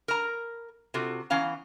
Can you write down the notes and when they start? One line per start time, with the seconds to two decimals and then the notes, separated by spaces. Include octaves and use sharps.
0.08 A#4 A#5
0.94 C3 F4 F#4 A4
1.30 E3 B3 C#4 F5 A#5